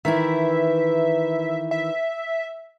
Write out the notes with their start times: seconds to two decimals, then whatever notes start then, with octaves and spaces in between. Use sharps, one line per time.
0.05 D#3 E3 E4 E5
1.71 E5